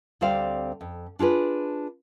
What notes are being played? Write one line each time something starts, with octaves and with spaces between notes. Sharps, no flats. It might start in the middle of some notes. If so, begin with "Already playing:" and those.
D2 G3 C4 C5 D5 F5
F2
D4 F4 G#4 B4